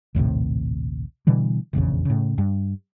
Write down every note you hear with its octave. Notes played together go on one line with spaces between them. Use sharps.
A#1 D#2 A2 C3
B2 D3 E3 G3
F1 A#1 E2 C#3
A2 C#3
G2